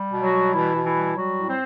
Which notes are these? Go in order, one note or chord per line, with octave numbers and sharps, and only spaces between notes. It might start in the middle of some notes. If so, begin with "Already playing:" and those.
Already playing: G3
B2
F#3 F#4
G3
B2 E3 E4
B2
E3 E4
G3
F#3 G3 F#4
A2
C4 C5